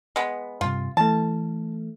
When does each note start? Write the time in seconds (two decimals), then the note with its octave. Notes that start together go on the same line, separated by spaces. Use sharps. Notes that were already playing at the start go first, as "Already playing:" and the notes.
0.16 G#3 B3
0.61 G2 C3 F4
0.97 E3 A3 A5